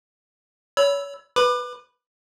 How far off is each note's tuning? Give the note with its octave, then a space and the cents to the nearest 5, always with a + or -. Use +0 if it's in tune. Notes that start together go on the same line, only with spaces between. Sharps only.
C#5 +30 B5 +0 E6 +0
B4 +0 B5 +0 D6 +35